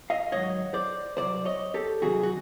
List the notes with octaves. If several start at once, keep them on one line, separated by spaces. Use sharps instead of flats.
D#5 F5
G#2 D#3 F#3 C#5 D#5
C5 D5
C2 C3 F#3 C5 D5
C#5 D#5
G4 A4
C2 C3 D#3 F#3 F#4 G#4
F#4